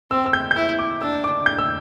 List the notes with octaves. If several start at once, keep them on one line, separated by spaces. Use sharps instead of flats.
C4 E6
E6
G6
G6
E4 E6
D6
D4 E6
D6
G6
E6